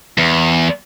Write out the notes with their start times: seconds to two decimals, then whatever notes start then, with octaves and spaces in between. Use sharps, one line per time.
0.18 E2